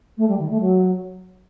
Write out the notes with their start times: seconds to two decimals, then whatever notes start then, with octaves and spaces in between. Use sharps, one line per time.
0.18 A3
0.28 G3
0.39 D#3
0.50 A3
0.60 F#3